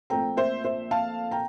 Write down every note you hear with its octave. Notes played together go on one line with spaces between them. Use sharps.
A#1 A#2 A3 C4 G5 A#5
C5 E5
C5 E5
F5 A5
G5 A#5